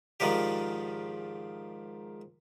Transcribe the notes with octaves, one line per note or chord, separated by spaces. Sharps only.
G#2 D#3 F3 D4 G4